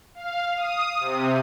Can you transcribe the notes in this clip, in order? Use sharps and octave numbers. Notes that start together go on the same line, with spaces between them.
F5
D#6
C3